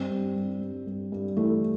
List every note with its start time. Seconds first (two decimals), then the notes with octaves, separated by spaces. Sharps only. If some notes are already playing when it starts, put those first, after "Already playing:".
Already playing: G2 C4
0.11 G2
0.36 G2
0.61 G2
0.87 G2
1.12 G2
1.37 E3 A3